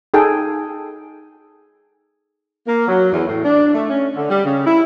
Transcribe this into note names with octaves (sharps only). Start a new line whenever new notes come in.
D#4 G#4 A4 G5
A#3
F#3
E2
A2
D4
A3
C#4
D3
G3
C#3
E4